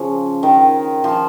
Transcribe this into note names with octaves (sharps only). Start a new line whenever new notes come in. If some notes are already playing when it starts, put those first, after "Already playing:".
Already playing: C#3 F3
D#3
F3